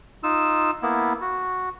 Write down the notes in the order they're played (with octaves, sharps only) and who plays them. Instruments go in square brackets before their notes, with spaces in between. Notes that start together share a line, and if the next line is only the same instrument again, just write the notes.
[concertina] D#4 F4 E6
A#3 B3 E4
F#4